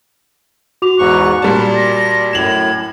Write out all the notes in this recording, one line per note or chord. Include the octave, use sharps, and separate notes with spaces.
F#4 D6 F7
E2 G#2 C#6 F#6
A#2 G3 D5 A5 A#5
A#6
F#2 A2 G#6 E7 F#7